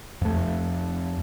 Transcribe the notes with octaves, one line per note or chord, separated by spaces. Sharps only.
F2 A3